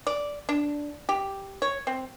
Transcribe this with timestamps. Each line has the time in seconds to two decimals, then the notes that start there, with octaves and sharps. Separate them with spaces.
0.07 D5
0.49 D4
1.09 G4
1.62 C#5
1.87 C4